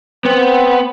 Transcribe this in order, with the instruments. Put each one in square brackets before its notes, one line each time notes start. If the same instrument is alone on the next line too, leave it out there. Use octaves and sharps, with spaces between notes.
[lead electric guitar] B3 [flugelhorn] C4